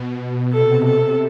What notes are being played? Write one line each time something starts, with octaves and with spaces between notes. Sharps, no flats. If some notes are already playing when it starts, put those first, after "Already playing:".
Already playing: B2
C3 A4
C3 A4